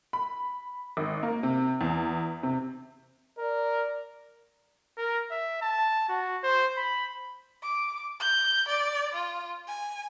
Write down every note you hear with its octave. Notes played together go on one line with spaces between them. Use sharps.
B5
G#1
A#3
C3
E2
C3
A#4 D5
A#4
E5
A5
F#4
C5
B5
D6
G6
D5
F4
G#5